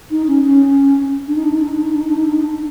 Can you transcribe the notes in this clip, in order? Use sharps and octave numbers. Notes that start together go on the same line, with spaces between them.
D#4
C#4
C#4
D4
D#4
D4
D#4
D4
D#4
D4
D#4
D4
D#4
D4
D#4
D4
D#4
D4